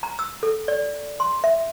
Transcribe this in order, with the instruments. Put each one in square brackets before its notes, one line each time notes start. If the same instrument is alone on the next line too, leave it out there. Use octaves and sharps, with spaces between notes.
[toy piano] A#5
E6
A4
D5
C6
E5